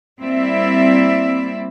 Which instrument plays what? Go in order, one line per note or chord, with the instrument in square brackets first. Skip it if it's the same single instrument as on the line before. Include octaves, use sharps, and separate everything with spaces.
[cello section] G3 A#3 C4 E4 D5 E5